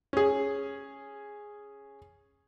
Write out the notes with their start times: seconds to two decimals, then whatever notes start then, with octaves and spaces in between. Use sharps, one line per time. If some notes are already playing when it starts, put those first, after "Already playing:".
0.13 C#4 G#4